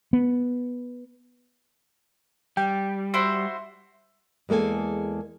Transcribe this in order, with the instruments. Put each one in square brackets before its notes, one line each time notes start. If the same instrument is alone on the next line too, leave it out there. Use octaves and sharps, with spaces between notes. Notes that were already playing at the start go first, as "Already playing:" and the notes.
[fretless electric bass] B3
[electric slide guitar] G3 [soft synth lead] G5
[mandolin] E4 F#4 C5 [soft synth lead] C6
[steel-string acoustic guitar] E2 G#3 A#3 A4 G#5